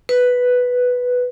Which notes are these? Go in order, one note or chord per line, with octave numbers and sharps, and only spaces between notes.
B4